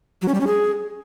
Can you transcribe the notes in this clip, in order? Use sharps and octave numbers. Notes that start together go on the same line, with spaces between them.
F#3
C#4
G3
C#4
G#4